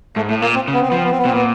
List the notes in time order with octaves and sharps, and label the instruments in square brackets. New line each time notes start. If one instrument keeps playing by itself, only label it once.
[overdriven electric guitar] G#2 [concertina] A3
[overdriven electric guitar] A2 [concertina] A3
[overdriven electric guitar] A#2 [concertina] A#3
[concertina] C4
[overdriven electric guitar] C#3
[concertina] B3
C4
B3
[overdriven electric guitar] F3 [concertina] C4
[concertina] B3
C4
B3
[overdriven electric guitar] B2 [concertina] C4
[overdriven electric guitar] A#2 [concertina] B3